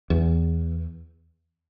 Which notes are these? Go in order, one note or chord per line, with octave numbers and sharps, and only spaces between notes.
E2